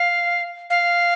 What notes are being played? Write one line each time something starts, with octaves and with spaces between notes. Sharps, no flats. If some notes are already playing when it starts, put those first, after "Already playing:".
Already playing: F5
F5